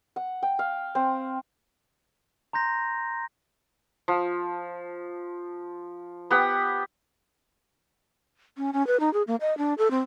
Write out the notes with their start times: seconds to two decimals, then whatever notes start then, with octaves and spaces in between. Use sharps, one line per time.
0.16 F#5
0.43 G5
0.59 F5
0.95 C4
2.53 A#5 C6 G6 A#6
4.08 F3
6.30 B3 G4 F#5 B5
8.57 C#4
8.73 C#4
8.87 B4
9.00 D#4
9.13 G#4
9.27 A#3
9.41 D#5
9.58 D4
9.78 A4
9.91 C4